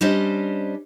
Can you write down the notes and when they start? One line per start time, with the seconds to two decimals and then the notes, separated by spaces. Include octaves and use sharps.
0.01 G3 C#4 D4 C5 D#5